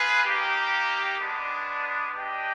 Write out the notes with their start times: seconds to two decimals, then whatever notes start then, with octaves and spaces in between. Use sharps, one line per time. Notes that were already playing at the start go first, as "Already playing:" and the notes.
Already playing: F4 G#4 B4
0.25 A#3 D#4 G4
1.19 G#3 B3 D4
2.13 D4 G4 B4 D#5 G5